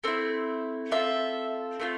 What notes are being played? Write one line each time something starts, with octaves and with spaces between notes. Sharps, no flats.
A3 C4 E4
C4 F4 A4 E5
A3 C4 F4